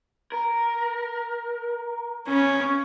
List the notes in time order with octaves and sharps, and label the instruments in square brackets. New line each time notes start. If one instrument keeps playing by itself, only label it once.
[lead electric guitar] A#4
[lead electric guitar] C#3 [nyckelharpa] C#4